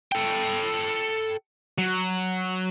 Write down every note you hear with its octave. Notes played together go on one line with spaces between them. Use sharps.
A4 G5
F#3